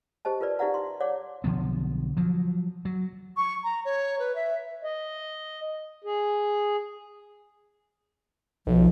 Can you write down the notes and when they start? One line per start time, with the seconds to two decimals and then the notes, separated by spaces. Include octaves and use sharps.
0.25 G4 C5 D#5 A5
0.41 F4 A#4 B4 D5
0.59 D#4 G4 D5 E5 F#5 A#5
0.74 C6
1.00 C#5 D5 F#5 D6
1.44 B1 D3 F3 B3
2.17 F3 F#3
2.85 F#3
3.37 C#6
3.64 A#5
3.85 C#5
4.19 B4
4.35 E5
4.84 D#5
6.04 G#4
8.67 B1 F3